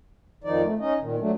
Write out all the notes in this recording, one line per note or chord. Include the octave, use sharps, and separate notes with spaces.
F2 D#3 F3 D#4 D5
A3
C#4 D#4 D#5
A#2 D#3
F#3 A3 D4